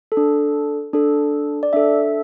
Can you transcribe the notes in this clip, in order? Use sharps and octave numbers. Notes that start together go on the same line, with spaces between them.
A4
D4
D4 A4
D5
D4 A4 E5